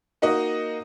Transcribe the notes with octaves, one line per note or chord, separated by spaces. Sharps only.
A#3 D#4 F#4 D#5